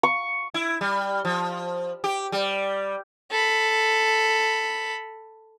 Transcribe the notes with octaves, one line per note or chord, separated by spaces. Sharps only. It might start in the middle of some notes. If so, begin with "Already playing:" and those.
C#6
E4
G3
F3
G4
G3
A4 B5